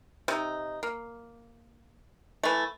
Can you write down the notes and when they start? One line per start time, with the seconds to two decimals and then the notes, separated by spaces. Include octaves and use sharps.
0.28 C3 D#4
0.83 A#3
2.43 E3 A3